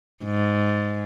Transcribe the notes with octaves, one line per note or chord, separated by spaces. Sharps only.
G#2